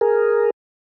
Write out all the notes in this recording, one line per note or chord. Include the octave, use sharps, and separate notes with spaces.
G#4 A#4